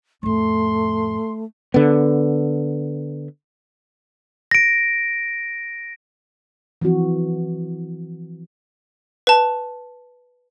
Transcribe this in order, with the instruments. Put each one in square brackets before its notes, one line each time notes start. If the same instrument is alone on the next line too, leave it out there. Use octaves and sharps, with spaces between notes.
[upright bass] F2 A2 [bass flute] A3 [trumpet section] C6
[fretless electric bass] D3 B3
[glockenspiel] A#6 D7
[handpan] E3 F3 C4 F#4
[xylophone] B4 A5